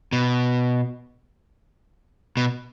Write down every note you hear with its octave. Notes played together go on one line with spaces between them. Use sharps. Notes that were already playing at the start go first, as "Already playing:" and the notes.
B2
B2